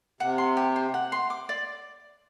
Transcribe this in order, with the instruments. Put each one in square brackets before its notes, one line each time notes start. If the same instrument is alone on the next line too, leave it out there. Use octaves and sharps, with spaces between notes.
[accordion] C3 [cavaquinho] F#5
[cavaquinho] C6
G4
C5
F#5
C6
D6
D5